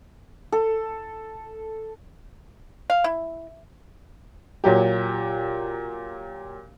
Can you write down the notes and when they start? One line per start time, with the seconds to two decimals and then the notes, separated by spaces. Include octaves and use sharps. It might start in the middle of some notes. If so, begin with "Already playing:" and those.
0.52 A4
2.90 F5
3.04 E4
4.64 A#2 F#3 G4